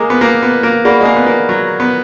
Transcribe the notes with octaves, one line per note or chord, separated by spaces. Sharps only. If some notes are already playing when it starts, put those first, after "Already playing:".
Already playing: G#3 A#3 A#4 D#5 A#5 D6
B3
A#3
B3
A#3
A#3 G#4 D5 F#5 B5
G#3
A#3
B3
A#3
F#3
B3